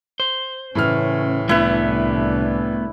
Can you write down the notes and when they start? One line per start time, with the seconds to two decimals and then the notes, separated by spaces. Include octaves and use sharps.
0.20 C5
0.75 A2 C#3 E3 C#4 F6
1.49 C2 A3 B3 D4 E4 B4